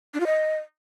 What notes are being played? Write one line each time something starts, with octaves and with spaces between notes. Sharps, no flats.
D4
F4
D#5